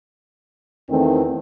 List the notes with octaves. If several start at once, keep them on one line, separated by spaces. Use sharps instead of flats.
E2 D#3 A3 C4